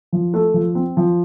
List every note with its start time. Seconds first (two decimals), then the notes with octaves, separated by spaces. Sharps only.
0.13 F3
0.34 A3
0.54 F3
0.75 C4
0.97 F3